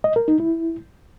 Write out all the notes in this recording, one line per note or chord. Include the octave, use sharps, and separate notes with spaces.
D#5
A#4
D#4
E4